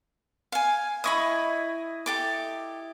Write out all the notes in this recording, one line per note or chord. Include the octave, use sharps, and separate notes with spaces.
F5 G#5
E4 D#5 B5 C#6 D#6
G4 A4 D6